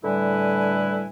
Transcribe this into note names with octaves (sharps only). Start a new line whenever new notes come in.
A2 D3 G3 E4 B4 G#5